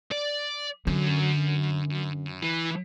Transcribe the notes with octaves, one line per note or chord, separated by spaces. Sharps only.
D5
F#2 D3
E3